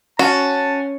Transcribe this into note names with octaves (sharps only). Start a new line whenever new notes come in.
C#4 F#4 A5